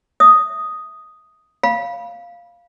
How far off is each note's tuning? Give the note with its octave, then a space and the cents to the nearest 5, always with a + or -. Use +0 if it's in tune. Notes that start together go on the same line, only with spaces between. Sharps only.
E5 +0 D#6 +0
F5 +0 B5 -25